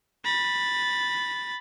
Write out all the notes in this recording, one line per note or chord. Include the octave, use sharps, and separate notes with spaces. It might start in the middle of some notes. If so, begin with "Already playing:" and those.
B5 A6